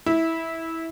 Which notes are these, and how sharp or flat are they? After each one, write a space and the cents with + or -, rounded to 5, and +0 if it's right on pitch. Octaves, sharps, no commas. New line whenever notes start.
E4 -15